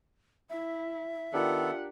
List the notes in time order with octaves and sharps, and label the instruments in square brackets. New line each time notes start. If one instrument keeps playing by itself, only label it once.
[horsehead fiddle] E4 [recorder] E5
[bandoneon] D#3 B3 A4 [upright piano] D4 G4 A#4 [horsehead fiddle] F4 F#5